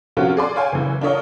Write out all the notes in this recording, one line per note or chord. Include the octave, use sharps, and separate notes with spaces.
C3 F3 C#4 F4 F#4 A#4
G#4 D5 C6
C#5 F5 G5 G#5
F#1 E3
D4 F4 A#4 C#5 D#5